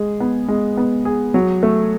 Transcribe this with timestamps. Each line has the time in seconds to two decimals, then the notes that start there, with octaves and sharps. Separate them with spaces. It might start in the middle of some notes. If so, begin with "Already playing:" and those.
Already playing: G#3 G#4
0.20 B3
0.48 G#3
0.77 B3
1.05 G#4
1.34 F#3
1.63 A3